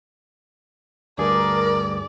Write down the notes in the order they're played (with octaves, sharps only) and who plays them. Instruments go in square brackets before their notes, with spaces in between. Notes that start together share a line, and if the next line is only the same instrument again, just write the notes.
[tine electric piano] D2 G2 G#4 [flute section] A#4 D6 [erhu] D5